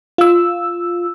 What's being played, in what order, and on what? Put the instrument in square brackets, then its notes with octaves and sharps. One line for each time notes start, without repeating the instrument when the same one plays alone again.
[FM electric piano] F4 E6